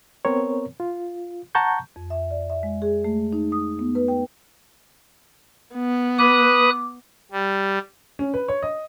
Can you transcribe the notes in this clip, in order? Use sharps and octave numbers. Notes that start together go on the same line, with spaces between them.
B3 C4 A#4 C#5
F4
F#5 A5 A#5 C#6 G6
F2
E5
D5
E5
G#3
G#4
A3
D#4
D#6
B3
B4
G5
B3
B4 D6 D#6 F#6
G3
C#4
B4
C#5
D#5